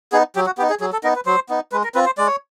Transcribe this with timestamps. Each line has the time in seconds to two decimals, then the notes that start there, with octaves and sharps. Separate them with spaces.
0.12 B3 D#4 G#4
0.36 F#3 G4
0.46 F#4
0.58 B3 G4
0.62 D#4
0.70 G#4
0.81 F#3 G#4
0.93 A4
1.03 B3 D#4 A#4
1.16 B4
1.26 F#3 C5
1.49 B3 D#4
1.72 G#3 B4
1.84 A#4
1.95 C4 F4 B4
2.06 C5
2.18 G#3 D5
2.27 C#5